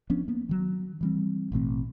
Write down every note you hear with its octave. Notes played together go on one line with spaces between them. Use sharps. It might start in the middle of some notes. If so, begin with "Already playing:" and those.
F3 B3 C#4 D4
A#3 B3
D#3 F#3
E3 G3 C4
A1 B2 A3 C4